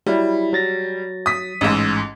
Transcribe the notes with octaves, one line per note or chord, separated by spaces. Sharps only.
F#3 G3 E4
F#3 A6 A#6
D#6 B6
A1 G#2 D#6 E6